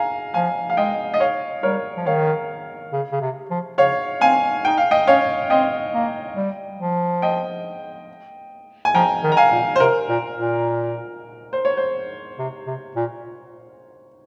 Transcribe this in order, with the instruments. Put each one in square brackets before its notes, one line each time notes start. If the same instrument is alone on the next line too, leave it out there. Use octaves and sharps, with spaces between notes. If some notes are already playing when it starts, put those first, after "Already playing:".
Already playing: [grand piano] F5 G#5 A#5
[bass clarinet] F3 [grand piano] F5 G#5
[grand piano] F5
[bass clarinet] G#3 [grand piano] D#5 G5
[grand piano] D#5
C#5 F5
[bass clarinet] G3 [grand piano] A#4 C#5
[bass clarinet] F3
[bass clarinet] D#3 [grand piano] C#5 F5
[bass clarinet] C#3
C#3
C3
F3
[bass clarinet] C#3 [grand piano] C#5 F5
[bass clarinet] C4 [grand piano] F5 G#5
[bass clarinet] D#4 [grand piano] G5
[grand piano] F5
D#5 G5
[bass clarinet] C#4 [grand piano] C#5 F5
[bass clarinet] C4 [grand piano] D#5 G5
[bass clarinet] A#3
G3
F3
[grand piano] D#5 G5
G#5
[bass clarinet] F3 [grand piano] G5 A#5
[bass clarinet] D#3
[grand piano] A#5
F5 G#5
[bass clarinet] A#2
[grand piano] C5
[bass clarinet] C3 [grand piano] A#4
[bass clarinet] A#2
A#2
[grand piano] C5
C#5
C5
[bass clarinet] C3
C3
A#2